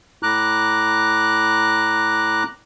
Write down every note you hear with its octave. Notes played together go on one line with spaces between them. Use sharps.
A2 A#5 D6 F#6